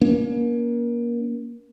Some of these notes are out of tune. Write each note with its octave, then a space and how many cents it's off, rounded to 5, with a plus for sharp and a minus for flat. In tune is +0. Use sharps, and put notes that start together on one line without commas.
A#3 +30 C#4 +40